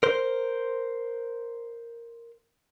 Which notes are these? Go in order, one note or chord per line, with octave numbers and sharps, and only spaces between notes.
A#4 C5